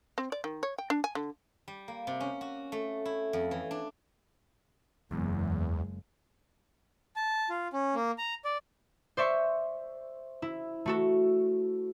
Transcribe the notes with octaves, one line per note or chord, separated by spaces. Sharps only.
C4
D5
D#3
C#5
G5
D4
G#5
D3
G3
A#3
C3
C#4
F#4
A3
E4
F2
E3
D4
F#1 E2 G#3
A5
F4
C#4
A#3
A#5
D5
C5 D5 E5 C#6
E4
A3 F#4 A4